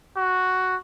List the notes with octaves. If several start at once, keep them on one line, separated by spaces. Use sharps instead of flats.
F#4